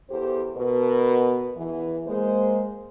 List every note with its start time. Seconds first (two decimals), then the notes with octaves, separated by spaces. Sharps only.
0.10 E2 G4 A4 C5
0.57 B2 A#4 B4
1.56 E2 E3
2.07 G#3 A#3 C5